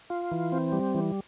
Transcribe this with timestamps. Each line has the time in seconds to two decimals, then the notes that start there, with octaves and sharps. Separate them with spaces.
0.10 F4
0.32 E3
0.52 C4
0.72 G3
0.95 E3